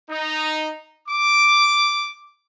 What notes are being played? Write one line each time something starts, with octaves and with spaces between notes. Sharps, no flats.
D#4
D6